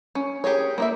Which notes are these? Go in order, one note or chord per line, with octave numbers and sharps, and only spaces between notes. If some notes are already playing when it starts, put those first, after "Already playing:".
C#4
G4 G#4 A#4 C#5
A#3 E4 E5